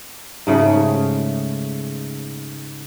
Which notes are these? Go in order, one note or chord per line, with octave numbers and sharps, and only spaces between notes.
G#2 C#3 A3 G#4